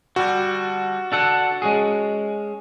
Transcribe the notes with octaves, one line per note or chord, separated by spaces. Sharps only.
D3 G3 F#4
D4 A4 F#5
G#3 C#4 G#4